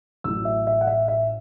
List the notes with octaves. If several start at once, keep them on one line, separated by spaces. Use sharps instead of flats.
A1 A2 F#3 E6
E5
E5
F#5
E5
E5